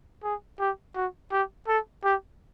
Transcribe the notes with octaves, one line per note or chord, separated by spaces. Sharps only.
G#4
G4
F#4
G4
A4
G4